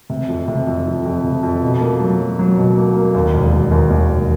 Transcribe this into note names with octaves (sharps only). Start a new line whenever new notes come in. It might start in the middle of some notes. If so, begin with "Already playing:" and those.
C3
F2
C3
F2
F3
F2
C3
F2
B2
A#3
F#3
F#3
F#3
B2
A#3
A#3
D#2
E1
E1
D#2
D#2
E1